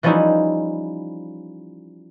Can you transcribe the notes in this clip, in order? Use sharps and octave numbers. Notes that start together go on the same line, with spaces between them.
E3 F3 G3 C#4 D#4 E4